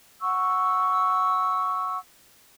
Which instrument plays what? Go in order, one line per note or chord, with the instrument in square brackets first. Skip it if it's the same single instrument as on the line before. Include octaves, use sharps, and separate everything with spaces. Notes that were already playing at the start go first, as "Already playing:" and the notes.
[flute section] F#5 C#6 E6